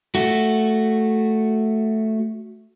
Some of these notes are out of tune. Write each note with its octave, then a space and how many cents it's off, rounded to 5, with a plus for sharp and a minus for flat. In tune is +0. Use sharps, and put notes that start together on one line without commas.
A3 +0 F#4 +0